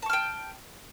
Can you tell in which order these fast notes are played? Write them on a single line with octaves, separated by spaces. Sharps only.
A5 C#6 F6 G5